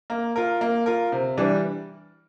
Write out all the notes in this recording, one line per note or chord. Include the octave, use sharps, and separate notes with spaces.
A#3
F4 A#4
A#3
F4 A#4
C3
E3 G3 D4